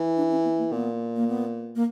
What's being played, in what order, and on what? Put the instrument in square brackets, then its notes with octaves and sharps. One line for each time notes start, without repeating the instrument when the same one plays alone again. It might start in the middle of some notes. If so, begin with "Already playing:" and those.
Already playing: [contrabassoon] E3
[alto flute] D4
C#4
B3
A#3
[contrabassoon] A#2 [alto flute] B3
[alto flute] A#3
B3
A#3